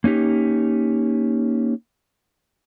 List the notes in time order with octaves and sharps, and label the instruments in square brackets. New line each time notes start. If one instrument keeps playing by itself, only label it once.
[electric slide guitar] A#3 C#4 D#4 G4